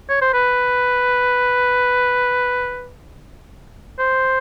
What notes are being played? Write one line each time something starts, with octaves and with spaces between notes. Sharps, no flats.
C#5
C5
B4
C5